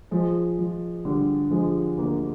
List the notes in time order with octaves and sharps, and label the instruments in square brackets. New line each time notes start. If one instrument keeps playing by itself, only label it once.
[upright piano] F3 G#3
F3
D3 G3
F3 G#3
D2 A#3